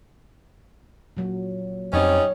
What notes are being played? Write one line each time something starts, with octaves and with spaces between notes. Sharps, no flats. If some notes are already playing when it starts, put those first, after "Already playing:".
A#2 F#3
F2 G3 C4 C#4 D#4 C#5